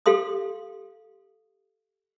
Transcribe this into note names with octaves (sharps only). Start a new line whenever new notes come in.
G4 A4 F5 C6 D#6